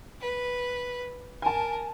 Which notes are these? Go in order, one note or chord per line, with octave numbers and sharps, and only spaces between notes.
B4
A#4 G#5 A5